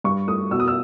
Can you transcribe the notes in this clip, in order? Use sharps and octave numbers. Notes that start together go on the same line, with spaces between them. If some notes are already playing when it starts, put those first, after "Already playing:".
G2 C#6
A3 D#6
B2 E6
D#6
E6